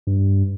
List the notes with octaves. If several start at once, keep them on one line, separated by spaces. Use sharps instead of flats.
G2